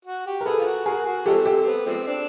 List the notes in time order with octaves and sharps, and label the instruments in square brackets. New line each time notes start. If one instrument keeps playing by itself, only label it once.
[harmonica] F#4
G4
[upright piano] A#4
[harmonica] G#4 [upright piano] A4 B4
[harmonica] F4
F#4
[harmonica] F#4 [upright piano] G#4 A#4
[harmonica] F#4
[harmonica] F3 G#3 C4 [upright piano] G4 A4
[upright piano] G4 A4
[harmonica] B3
F3 G#3 C4
D4